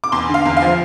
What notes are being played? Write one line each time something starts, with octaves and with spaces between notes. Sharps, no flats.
D6
E2 C6
D3
F5
E2
F5
F3